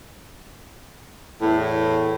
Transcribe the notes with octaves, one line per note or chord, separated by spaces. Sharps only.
E2 A2